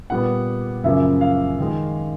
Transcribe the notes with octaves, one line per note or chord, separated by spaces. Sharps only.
A#2 G3 B3 F#5
F#2 C#3 F3 A#3 E5
F5
D#3 G#3